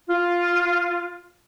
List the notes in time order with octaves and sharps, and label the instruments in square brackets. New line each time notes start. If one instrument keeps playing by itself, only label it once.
[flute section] F4